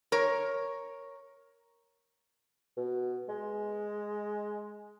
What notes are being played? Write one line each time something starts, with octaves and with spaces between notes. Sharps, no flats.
A#4 C#5
B2
G#3